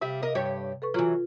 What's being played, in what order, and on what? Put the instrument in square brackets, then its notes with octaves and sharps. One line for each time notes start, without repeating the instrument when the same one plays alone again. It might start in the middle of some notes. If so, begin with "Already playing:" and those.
[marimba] C3 [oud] G3 E5
[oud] A#4 D#5
G2 G4 C#5
[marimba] A4 B4 C#6
[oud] E3 F#3 [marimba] F4